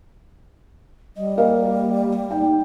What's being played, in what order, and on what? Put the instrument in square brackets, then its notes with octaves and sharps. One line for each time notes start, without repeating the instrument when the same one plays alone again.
[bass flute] G3 [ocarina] D#5
[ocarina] A#3 [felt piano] A#4 D#5 F5
[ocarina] D#4 [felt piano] G5